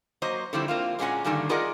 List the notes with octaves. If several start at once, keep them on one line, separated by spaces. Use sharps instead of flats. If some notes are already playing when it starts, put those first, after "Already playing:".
F#3 A#3 C5 D#5
D3 F3 G3 A3 C4 E4
A#3 C4 F4
A#2 G#3 A#3 C#4 F#5 G#5
G2 D3 D#3 G3 A3 A#3
F4 G#4 A#4 D5 D#5 F#5